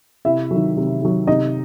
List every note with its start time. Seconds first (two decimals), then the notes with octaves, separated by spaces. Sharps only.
0.25 C3 E4 E5
0.51 D#3 F#3
0.77 C3
1.02 D#3 F#3
1.27 C3 D#4 D#5